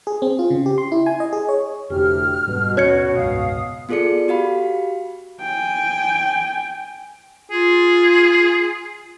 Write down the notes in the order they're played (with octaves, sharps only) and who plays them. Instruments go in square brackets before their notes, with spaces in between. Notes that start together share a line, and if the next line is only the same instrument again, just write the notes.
[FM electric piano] G#4
C4
F4
C#3
G4
C6
E4
G#5
D#5
G#4
C#5
[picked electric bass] F1 [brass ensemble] D2 A2 G4 [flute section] F6
[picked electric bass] G1 G#2 G3 [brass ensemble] B2
[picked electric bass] A#1 D#2 C#4 [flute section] F#4 [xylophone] C#5 G#6 C#7
[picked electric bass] F#1 C#2 G#2 [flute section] F5 D#6
[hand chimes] B3 F4 G#4 A4 D5 C#7
F#4 G4 F5 B5
[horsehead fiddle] G5 G#5
[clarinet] F4 [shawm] G#4